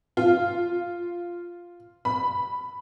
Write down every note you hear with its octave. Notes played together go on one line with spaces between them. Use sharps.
F4
B5